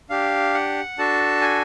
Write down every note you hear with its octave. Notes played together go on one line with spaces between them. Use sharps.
D4 G4 F5
F#5
D4 F#4 A4 A5
G#5